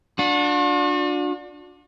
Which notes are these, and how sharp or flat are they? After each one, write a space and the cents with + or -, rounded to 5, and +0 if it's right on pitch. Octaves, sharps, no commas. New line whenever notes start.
D4 +0 F#4 -45